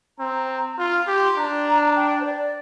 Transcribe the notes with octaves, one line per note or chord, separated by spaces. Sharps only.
C4 A#5
F4 C6
G4
C6
D4 A#5
G5
C5
D5